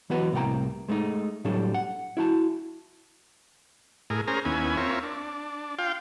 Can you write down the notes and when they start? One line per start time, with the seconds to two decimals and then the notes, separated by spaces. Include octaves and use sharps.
0.10 E3 F#3 B3 F#4 B4 D#5
0.33 C2 A2 A#3 F#5 G5 A#5
0.88 G#3 A3 C#4 D#4
1.44 A2 F#3 G3 D4 A4
1.74 F#5
2.17 E4 F#4 A5
4.10 A2 G#4 A#4
4.28 C#4 G#4 A#4 C5 A#5
4.45 D#2 B3 C#4 E4 G#5
4.77 C4 F4 A#4 C#5 E5
5.03 D4
5.79 F4 F5 G5 C6